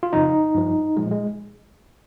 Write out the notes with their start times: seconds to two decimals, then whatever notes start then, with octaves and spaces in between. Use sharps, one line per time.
0.03 F4
0.13 F2 C#3 F3 D#4
0.55 G2 F3
0.97 A#2 F3 G#3
1.11 G#3